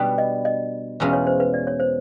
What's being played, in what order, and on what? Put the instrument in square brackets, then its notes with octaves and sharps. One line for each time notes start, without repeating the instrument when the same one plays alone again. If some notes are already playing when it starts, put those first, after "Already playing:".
Already playing: [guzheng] B2 G3 B3 D4
[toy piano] D#5
D#5
[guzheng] E2 B2 G#3 C#4 F4
[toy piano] C#5
C5
B4
D5
C#5
C5